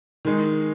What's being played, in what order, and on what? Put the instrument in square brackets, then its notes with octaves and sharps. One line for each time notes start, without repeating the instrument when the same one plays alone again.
[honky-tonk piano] D#3 G#3 D#4